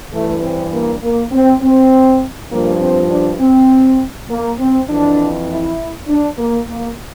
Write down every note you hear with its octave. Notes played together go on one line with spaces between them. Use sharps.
G2 E3 A3
C4
A#3
A#3
C4
C4
G2 F3 A#3
C4
D4
C4
A#3
C4
F2 E3 D4
E4
D4
A#3
A#3